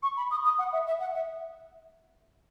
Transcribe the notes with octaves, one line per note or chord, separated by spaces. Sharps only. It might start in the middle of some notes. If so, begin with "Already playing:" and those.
C#6
B5
D#6
D#6
F#5
E5
E5
F#5
E5